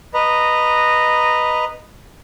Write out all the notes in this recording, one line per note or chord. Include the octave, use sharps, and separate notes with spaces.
B4 D#5 A#5